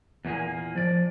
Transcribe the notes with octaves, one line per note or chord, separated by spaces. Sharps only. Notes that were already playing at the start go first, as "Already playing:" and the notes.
E2 A#2 A#3 G#4
F3 D5